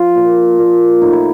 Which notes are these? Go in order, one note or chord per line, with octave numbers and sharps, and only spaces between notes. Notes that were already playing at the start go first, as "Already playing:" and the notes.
Already playing: F3 F4
A#2
A#2
A2 D#4
E4